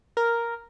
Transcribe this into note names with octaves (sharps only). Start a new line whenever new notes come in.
A#4